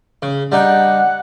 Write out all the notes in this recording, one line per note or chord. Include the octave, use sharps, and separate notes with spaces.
C#3
G3 D4 D#4 F#5